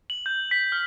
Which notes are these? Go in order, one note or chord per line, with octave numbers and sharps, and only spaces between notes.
F#7
G6
B6
F6